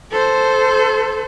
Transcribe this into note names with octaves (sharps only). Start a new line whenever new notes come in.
A4 C5